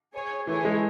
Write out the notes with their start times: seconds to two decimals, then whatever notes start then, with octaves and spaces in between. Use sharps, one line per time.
0.13 G#4 C#5 G#5
0.47 E3 A3 E4 G#4 C#5 G#5
0.65 G#3